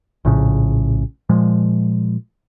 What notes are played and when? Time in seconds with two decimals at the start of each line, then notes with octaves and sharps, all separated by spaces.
0.25 A#1 A2 C#3
1.29 A#2 F3 G#3